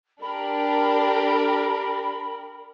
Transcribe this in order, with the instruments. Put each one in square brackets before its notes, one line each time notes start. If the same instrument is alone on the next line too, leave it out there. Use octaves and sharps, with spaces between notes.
[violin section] D4 G4 [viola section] A#4 [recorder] B5